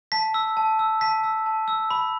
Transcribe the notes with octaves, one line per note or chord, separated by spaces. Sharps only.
A5 B6
E6
A5
E6
A5 B6
E6
A5
E6
B5